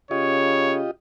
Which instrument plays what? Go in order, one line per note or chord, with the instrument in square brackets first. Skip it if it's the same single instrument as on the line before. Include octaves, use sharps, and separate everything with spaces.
[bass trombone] C#3 [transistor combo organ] F4 G4 D#5 [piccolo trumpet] C#5